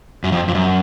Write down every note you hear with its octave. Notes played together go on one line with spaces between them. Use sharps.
F#2
F2
F2
F#2